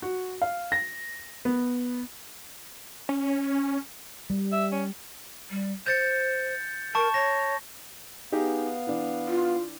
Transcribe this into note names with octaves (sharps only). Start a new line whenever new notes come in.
F#4
F5
A#6
B3
C#4
G3
E5
C#4
G3
C5 G6 A6 C#7
A#4 A5 C#6
C#5 A#6
B3 D#4 G4 G#4 F5
E3 D4
F4